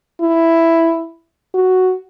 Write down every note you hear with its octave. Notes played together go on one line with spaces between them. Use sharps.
E4
F#4